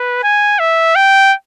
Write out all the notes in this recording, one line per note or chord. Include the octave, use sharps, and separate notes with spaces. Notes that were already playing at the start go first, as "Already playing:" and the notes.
Already playing: B4
G#5
E5
G5